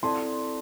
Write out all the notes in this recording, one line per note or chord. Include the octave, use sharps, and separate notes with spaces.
C4 E4 A4 D5 A5 C6